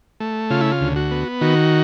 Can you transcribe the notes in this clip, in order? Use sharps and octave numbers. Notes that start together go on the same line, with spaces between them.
A3
C#3 F4
E4
F4
D2
F#4
B3
D#3 F#4